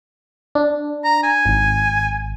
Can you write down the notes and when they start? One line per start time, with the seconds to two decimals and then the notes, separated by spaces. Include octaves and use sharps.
0.55 D4
1.04 A#5
1.23 G#5
1.45 G#1